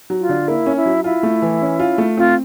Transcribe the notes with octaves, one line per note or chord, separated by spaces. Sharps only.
F#3
F4
D3
A#3 E4
C#4
E4
F#3
E4 F4
A3
E3
C#4
F4
A3
C4 F4